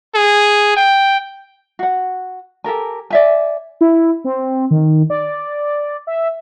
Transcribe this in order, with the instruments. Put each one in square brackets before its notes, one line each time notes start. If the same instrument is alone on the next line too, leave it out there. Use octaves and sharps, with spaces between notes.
[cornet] G#4
G5
[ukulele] F#4 F#5
G4 A4 A#4 G#5
D5 E5 G#5
[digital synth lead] E4
C4
D#3
D5
E5